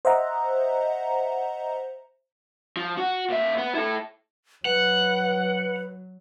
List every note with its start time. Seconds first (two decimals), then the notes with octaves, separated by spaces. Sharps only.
0.05 C5 D#5 E5 F#5 A#5
2.77 F3
2.97 F#4
3.30 A#2 E5
3.58 B3
3.75 E4 A4
4.65 F#3 B4 F#5